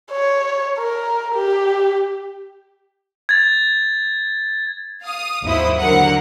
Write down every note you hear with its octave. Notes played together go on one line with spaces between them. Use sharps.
C#5
A#4
G4
G#6 A6
F5 D#6
G#1 D#2 F#3 E4 C5 D#6
D#2 D3 F#3 A#4 F#5